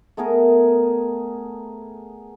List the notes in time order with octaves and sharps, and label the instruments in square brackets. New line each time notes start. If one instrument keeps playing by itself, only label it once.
[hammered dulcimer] A3 B3 G#4 A#4